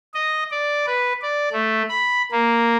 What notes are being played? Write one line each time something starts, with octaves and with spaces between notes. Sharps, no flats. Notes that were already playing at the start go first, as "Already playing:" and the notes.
D#5
D5
B4
D5
A3
B5
A#3